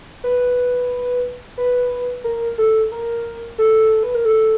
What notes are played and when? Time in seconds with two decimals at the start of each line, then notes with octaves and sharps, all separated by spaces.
0.24 B4
1.58 B4
2.24 A#4
2.58 A4
2.92 A#4
3.58 A4
4.03 B4
4.15 A#4
4.25 A4